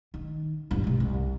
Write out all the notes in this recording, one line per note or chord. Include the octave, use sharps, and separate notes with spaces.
D#3
G2 E4
G2 C3
C2